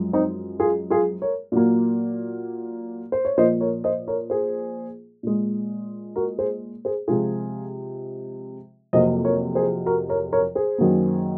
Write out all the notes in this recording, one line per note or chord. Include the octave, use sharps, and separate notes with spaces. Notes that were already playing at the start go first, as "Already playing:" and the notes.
Already playing: F#2 F3 G#3
C4 D#4
F4 G#4
F4 G#4
A#4 C#5
A#2 F#3 A#3
C5
C#5
A#2 F3 A#3 C5 D#5
A#4 C#5
C5 D#5
A#4 C#5
G#4 C5
A#2 G#3
F#4 A#4
G#4 C5
G#4 C5
C3 F3 G#3 F4 G#4
F2 C3 F#3 A#3 C5 D#5
A#4 C#5
G#4 C5
F#4 A#4
A#4 C#5
A#4 C#5
G#4 C5
F#2 D#3 F#3 A#3